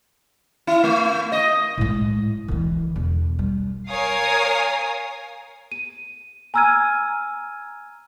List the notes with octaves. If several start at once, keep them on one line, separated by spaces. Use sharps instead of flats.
E4
A3
D#5
A2 G#3
D3 E3
E1
G3
A#4 C#5 F5 G#5 D#6
D#7
G#5 A#5 E6 F6 G#6 D#7